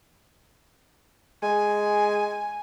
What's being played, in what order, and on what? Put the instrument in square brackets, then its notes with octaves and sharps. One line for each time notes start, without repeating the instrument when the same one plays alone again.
[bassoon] G#3 [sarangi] G#5